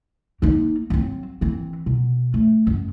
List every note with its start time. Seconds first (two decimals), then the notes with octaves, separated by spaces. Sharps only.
0.42 A#3 D#4
0.90 F#3 C4
1.41 E3 C4
1.86 B2
2.34 A3
2.67 F#2